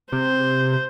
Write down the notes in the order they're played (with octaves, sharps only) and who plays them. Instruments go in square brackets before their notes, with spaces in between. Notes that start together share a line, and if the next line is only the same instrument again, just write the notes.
[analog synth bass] C3 [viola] C5